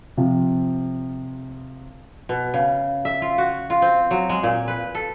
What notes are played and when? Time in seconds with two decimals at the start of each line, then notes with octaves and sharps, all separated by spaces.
0.17 C3 F3
2.29 B2
2.54 C#3
3.05 E5
3.22 F4
3.38 F#4
3.70 F4
3.82 C4
4.11 F#3
4.29 G#3
4.43 A#2
4.68 B4
4.95 A4